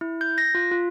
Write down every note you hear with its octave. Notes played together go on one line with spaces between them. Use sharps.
E4
G6
A#6
F4
F4